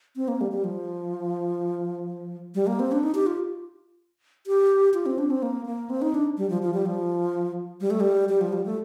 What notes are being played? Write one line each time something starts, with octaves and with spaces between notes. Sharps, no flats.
C4
A#3
G3
G3
F3
G3
A#3
C4
D4
D#4
G4
F4
G4
F4
C4
D4
C4
A#3
A#3
C4
D#4
D4
G3
F3
F3
G3
F3
G3
A3
G3
G3
F3
G3
A3